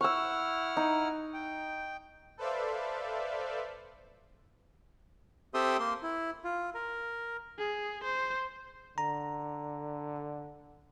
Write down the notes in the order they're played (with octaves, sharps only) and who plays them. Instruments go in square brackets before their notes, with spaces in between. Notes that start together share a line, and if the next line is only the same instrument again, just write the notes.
[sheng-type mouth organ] E4 F#5 F6 [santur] C#6 E6
[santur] D#4
[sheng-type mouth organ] G5
[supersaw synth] A4 B4 C5 D5 E5 F5
[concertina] C4 G4 A4 E5 C6 D#6
A#3 C6
E4
F4
A#4
[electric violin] G#4
C5
[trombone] D3 [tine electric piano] A#5